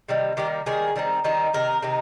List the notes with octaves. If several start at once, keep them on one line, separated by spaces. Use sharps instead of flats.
C3 D#3 G3
D#3 G3 A#3 G4
D#3 G3 A#3 G#4
D#3 G3 C4 D#4
D#3 G3 C4 D#4
C3 D#3 A#3 D#4 A#4
C3 D#3 A#3 D#4